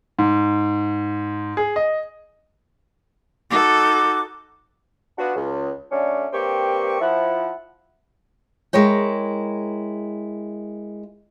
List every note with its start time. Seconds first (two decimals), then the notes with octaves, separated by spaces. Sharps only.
0.19 G#2
1.57 G#4
1.76 D#5
3.50 D#4 F#4 A4 D6
5.18 B3 D4 F4 F#4
5.36 C#2
5.92 D3 F#3 A3 C#4 D4
6.33 G2 A#3 C4 G4 G5 C#6
7.01 F3 E4 F#5
8.73 G#3 E4 A#4 C#5 G5